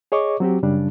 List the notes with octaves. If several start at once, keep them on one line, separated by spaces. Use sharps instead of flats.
G#4 C#5 D#5 C#6 D6
F#3 C4 F#4 G4
F#2 C#3 G3 D4